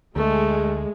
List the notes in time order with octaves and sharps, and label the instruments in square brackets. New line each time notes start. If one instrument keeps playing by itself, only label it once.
[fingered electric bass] D2 [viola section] G#3 [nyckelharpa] A3